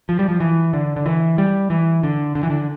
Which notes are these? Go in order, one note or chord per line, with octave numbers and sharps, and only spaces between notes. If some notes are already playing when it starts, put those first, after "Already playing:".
F3
G3
F3
E3
D3
D3
E3
G3
E3
D3
D3
E3
D3